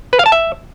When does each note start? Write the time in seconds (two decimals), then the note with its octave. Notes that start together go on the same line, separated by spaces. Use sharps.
0.13 B4
0.19 F5
0.26 A5
0.32 E5